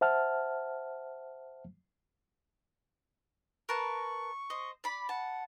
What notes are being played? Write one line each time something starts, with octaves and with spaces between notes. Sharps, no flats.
C5 E5 F#5 A5 F6
A#4 B4 A5 C#6
C5 D#5
D5 B5
F#5 A5